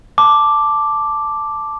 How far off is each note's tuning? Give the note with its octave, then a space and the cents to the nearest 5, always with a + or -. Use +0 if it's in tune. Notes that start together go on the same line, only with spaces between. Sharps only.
A5 +0 D6 +0